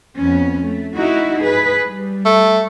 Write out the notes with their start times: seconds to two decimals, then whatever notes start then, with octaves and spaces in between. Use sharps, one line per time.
0.17 F2 B3 C#4
0.62 A3
0.95 D#4 E4 F#4
1.41 G#4 B4
1.85 G3
2.26 A3